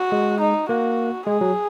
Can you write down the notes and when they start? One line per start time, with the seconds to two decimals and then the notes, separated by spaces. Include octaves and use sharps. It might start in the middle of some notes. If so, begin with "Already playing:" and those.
Already playing: F#4
0.12 G#3
0.41 D#4
0.69 A#3 F#4
1.26 G#3 G#4
1.41 F#3